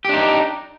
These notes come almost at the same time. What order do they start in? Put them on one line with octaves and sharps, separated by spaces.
G4 D4 D#4